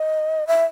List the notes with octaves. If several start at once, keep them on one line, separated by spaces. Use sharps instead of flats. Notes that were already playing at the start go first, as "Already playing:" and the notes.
Already playing: D#5
E5